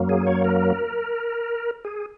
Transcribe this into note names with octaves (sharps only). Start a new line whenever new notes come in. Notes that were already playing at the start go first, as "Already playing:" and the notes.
Already playing: F#2 F#3 A#3
G#4
C#5
A#4
G#4